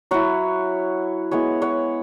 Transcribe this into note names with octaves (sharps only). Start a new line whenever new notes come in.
F#3 E4 C#5 F#5
G#3 B3 E4 C#5 F#5
C#5 F#5